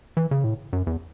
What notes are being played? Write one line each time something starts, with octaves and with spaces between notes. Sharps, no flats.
E3
C#3
A2
F#2
E2